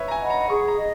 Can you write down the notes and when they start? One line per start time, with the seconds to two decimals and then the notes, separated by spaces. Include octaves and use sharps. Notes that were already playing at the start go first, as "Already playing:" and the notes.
Already playing: B4 C#5 E5
0.08 A#5
0.11 G#5
0.20 D#5 F#5 B5
0.30 A#5
0.49 G#4 C#6
0.68 A#5
0.77 D#5